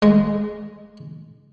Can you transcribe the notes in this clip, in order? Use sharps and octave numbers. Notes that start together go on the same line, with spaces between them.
G#3